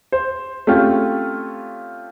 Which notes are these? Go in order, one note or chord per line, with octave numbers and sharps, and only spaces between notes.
C5
A3 C4 C#4 F4 G4